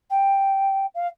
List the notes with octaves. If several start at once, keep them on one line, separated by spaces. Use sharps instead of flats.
G5
F5